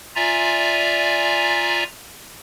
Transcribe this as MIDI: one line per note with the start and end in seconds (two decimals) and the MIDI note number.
0.15 1.84 65
0.15 1.84 74
0.15 1.84 76
0.15 1.84 80
0.15 1.84 82